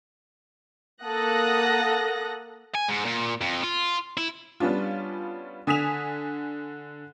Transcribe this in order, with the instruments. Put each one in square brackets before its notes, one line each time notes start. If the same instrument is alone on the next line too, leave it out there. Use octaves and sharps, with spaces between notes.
[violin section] A#3 A4 F#5 D#6 F#6 A#6
[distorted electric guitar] G#5
G#2
A#2
F2
F4
E4
[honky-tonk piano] G3 B3 C#4 D4 F4
D3 G#5 D#6 B6 E7 F7